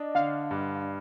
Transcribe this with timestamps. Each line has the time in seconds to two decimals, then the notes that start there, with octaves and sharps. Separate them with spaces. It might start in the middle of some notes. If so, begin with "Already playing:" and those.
Already playing: D4 D5 D#5
0.15 D3 F5
0.51 G2